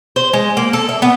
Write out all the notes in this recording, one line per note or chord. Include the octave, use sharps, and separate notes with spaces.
C5
G#3
A#3
A4
E5
B3